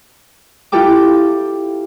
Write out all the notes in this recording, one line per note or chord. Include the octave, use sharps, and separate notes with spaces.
E4 F4 G4 A4 G5 D6